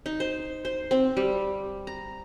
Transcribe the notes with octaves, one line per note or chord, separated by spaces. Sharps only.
D#4
C5
C5
C4
G3
A#5